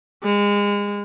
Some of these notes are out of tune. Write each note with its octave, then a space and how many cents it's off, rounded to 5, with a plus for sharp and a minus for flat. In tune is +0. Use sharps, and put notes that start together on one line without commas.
G#3 -30